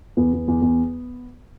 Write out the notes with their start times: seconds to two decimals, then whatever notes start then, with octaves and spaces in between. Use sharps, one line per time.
0.17 E2 B3
0.33 E2
0.48 E2
0.62 E2